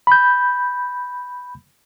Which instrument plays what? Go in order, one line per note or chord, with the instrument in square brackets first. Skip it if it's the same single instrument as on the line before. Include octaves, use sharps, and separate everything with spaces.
[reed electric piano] B5 G6